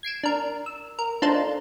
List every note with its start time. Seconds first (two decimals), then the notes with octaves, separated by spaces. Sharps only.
0.03 G#6 C7 D7 E7
0.23 D4 A#4
0.66 E6
0.99 A#4
1.22 D4 D#4 F4 A4 A#4 C5